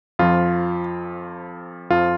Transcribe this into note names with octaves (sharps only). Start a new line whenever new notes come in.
F2 F3 F4
F2 F3 F4